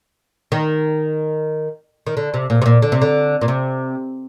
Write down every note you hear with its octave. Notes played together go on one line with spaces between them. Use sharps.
D#3
D#3
D3
C3
A#2
C3
A#2
D3
C3
D3
A#2
C3